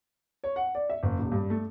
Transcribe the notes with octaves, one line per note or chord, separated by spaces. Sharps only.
C#5
F#5
D5
E5
F#1
D#1
G2
A3